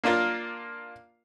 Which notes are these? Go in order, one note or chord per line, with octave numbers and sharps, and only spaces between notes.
A#3 D4 F4 A#4 F5